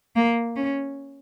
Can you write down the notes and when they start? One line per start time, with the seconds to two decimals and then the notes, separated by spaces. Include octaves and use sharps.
0.16 A#3
0.56 C#4